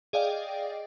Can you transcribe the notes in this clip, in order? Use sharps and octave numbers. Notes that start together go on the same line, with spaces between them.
G#4 D5 D#5 F5 G5